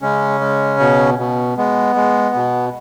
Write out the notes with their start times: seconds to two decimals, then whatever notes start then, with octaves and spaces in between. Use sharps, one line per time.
0.02 C#3 G#3 C#4
0.41 G#3
0.80 B2
1.18 B2
1.57 G#3 B3
1.96 G#3
2.35 B2